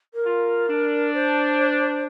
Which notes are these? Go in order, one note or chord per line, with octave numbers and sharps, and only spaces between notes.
A#4
F4
D4
C5